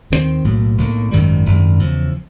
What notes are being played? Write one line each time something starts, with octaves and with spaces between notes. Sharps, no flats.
D#2 D#3 G3 C4
B1 A2 F#3 A#3
B1 A2 F#3 A#3
G#1 F#2 D#3 G3
G#1 F#2 D#3 G3
E2 C#3 F3